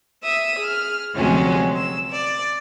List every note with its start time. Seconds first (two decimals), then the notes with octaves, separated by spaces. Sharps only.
0.24 E5 D#6 E6
0.58 G#4 F6
1.15 D2 C3 F3 F#3 G#3 C#4
1.77 E6
2.09 D5